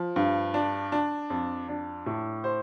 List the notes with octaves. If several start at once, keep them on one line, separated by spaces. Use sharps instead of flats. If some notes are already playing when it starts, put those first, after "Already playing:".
Already playing: F3
G2
D4
D4
F2
D4
A2
C5